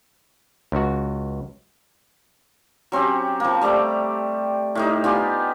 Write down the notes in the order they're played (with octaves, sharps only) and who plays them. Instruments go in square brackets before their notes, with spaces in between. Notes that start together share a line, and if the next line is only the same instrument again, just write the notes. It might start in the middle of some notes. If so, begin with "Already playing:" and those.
[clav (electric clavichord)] C#2 F#4
[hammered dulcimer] F#3 C4 C#4 G4
F3 A#3
G3 A3 D5 A#5
A2 G3 D#4
B3 F4 G4 G#5